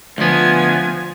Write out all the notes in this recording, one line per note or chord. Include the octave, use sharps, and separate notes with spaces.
D2 F3 B3 G#5